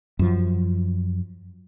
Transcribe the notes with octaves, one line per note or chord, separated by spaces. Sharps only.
F#2 F3